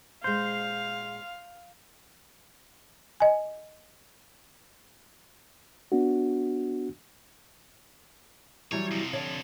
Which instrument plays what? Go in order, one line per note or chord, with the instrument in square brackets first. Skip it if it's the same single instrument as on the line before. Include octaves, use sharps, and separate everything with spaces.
[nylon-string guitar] A#2 G#3 [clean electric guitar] C5 [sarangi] F5
[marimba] D#5 G#5
[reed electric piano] B3 D4 F#4
[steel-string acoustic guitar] E3 F#3 G3 [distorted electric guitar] C#5
[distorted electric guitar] F2 C3
[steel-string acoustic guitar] D3 C#5 D5